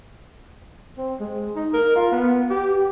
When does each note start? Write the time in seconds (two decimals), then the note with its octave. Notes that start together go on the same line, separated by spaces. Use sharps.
0.98 C4
1.20 G#3
1.55 D#4
1.74 A#4
1.96 F4
2.12 B3
2.50 G4